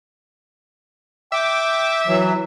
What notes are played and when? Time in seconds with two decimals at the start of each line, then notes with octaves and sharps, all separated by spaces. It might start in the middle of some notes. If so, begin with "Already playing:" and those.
1.32 E5 G5 D6
2.07 E3 F#3